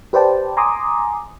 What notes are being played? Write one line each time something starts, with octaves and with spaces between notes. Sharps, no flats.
G4 B4 C5 D5 G5 A5
G#5 A#5 C6 D6 D#6